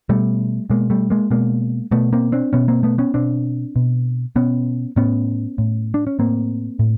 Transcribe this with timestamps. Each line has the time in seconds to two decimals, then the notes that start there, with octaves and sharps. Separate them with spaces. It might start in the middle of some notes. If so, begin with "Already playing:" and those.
0.09 B2 G3 A3
0.70 B2 G#3 A#3
0.90 G3 A3
1.10 G#3 A#3
1.31 B2 G#3 A#3
1.91 B2 A3 B3
2.13 A#3 C4
2.32 C4 D4
2.53 B2 B3 C#4
2.68 A#3 C4
2.83 A3 B3
2.98 B3 C#4
3.14 B2 C4 D4
3.76 B2
4.36 B2 B3 C#4
4.96 A2 B3 C#4
5.58 A2
5.94 D4
6.07 C#4
6.19 A2 A#3 C4
6.79 A2